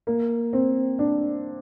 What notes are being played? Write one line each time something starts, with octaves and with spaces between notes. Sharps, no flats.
A#3
C4
D4